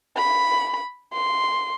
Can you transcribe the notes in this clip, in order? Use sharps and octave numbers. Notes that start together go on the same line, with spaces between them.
B5
C6